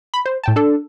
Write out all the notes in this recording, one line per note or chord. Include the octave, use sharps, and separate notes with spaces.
B5
C5
A2 G5 A5
D4 A4